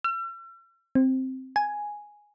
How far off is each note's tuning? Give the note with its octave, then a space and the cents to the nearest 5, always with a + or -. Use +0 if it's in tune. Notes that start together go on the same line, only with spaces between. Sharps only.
E6 +45
C4 +0
G#5 +0